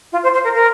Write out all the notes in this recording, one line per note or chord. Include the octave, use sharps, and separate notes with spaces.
F4
C5
C5
A#4
A#4